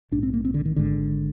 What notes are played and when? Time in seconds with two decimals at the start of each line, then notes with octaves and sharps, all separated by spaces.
0.11 A#1 G#2 D4
0.23 C4
0.34 A#3
0.45 C4
0.54 D3
0.65 D#3
0.76 G#1 G#2 D3